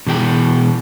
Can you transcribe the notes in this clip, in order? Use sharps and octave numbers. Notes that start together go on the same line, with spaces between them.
B2 E3 G#4 G5